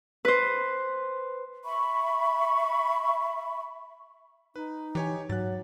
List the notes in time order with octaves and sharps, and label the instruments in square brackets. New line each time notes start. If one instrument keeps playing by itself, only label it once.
[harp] B4 C5
[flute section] E5 B5 C#6
[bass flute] D#4 [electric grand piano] B4
[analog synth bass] E3 [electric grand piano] G4 C#5 G#5
[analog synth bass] G#2 [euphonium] F#3 [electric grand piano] F#6 A6